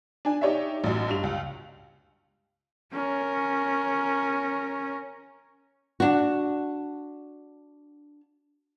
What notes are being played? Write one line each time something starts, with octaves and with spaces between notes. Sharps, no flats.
D4 G#5
D#4 G4 C#5 D5 E5
A1 F#2
G2 F7
C#2
C#4 A#4
D4 F#4